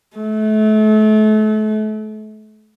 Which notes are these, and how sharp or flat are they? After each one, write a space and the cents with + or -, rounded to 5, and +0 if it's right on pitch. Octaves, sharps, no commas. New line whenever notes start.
A3 -35